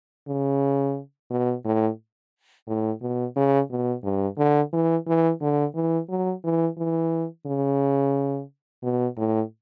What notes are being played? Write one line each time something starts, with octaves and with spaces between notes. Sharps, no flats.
C#3
B2
A2
A2
B2
C#3
B2
G2
D3
E3
E3
D3
E3
F#3
E3
E3
C#3
B2
A2